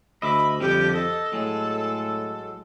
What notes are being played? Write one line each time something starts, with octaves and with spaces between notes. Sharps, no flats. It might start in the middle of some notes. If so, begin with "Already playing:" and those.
D2 D#5 E5 B5 D6
F2 D3 F3 G3 G4
A4 D#5
A2 F#3 G#3